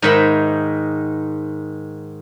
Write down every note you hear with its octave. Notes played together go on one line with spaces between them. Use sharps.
G#2 D#3 E5 B5